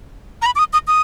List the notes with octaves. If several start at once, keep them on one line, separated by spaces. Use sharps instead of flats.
A#5
B5
D6
D#6
D#6
D#6